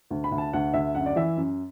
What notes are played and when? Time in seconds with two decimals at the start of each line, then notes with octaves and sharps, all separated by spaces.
0.10 D2
0.24 B5
0.31 D2
0.38 A5
0.53 D2 F#5
0.74 D2 E5
0.95 F#2 F#5
1.06 D5
1.16 E3 E5
1.37 F#2